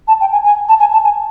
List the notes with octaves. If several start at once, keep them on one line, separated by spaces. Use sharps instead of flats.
A5
G5
G#5
G#5
A5
G#5
A5
G#5